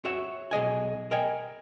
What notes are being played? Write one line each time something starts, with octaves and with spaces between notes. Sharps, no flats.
F#4 C#5 E5
B1 G#4 D#5 G#5
A#4 D#5 G5 G#5